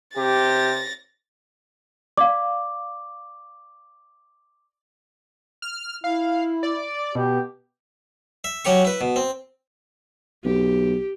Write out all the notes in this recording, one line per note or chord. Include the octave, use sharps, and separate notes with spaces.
C3 G4 A6 A#6
D5 F5 D6
F6
E4 F5
D5
B2 G4
E5
F#3 C#4 G4 C#6
E4 B4
B2
C4
B1 G4